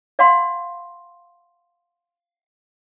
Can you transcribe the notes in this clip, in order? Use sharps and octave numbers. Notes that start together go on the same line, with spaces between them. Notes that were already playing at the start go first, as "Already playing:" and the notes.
D5 F5 F#5 B5 C6